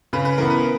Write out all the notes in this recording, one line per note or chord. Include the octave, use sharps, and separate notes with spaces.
C#3 B4
B4
E3 B3 A#4
B4